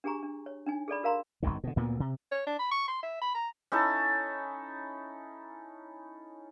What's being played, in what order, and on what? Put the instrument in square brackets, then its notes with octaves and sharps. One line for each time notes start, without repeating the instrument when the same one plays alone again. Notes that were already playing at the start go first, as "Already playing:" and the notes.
[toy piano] D4 G4 G#4 G#5 A#5 C#6
D4
C#5
D4 D#4 G#5
G#4 A4 D5 B5
F#4 A#4 F5 A#5 C6
[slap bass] G1 C2 F#2 D#3
B2 D3
D2 A#2 A#3 B3
C3
[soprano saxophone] C#5
D4
B5
C#6
C6
E5
B5
A#5
[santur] C#4 D#4 E4 A4